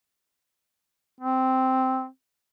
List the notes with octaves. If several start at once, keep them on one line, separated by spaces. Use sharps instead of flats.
C4